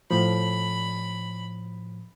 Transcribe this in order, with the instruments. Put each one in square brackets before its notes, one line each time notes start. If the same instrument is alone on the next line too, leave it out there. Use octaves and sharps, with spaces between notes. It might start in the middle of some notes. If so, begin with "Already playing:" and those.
[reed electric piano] A2 F3 [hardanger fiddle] B5